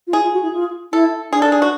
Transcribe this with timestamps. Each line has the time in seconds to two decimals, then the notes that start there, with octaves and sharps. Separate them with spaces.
0.07 F4
0.13 E4 G#4
0.23 F4
0.33 F#4
0.43 E4
0.53 F4
0.93 E4 A4
1.32 D4 G#4
1.42 A4
1.52 G#4
1.62 F#4